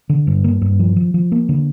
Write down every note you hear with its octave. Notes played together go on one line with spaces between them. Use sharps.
D3
G2
A#3
G2
F3
F3
F3
A#3
D3